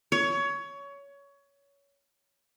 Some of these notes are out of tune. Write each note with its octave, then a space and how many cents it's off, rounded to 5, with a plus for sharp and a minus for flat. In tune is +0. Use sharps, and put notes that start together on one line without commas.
C#5 +20